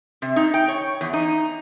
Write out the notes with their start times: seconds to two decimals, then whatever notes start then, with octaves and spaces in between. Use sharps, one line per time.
0.22 C3
0.36 D#4
0.54 G5
0.68 C#5
1.01 E2
1.13 D#4